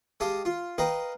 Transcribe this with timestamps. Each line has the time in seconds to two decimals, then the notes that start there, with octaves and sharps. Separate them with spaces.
0.20 G#3 G4 F5 A5 D#6
0.45 F4
0.78 A#4 B4 D#5 F5 G5